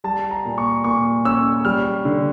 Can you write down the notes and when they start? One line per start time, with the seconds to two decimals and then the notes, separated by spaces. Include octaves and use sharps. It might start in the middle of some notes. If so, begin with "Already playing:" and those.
0.04 G3 A5
0.31 A#5
0.45 A#2
0.58 C#6
0.84 A#2 C#6
1.25 C#4 E6
1.65 G3 F6
2.05 D3